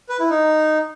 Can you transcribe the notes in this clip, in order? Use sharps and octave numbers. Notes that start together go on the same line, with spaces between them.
B4
E4
D#4